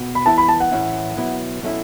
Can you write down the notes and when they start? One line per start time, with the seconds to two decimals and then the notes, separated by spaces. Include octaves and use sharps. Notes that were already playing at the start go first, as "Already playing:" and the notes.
Already playing: B2
0.15 B5
0.26 E3 B3 E4 A5
0.38 B5
0.49 A5
0.60 F#5
0.72 A2 E3 C#4 E4
1.17 B2 F#3 B3 E4
1.62 B2 F#3 A3 C#4 E4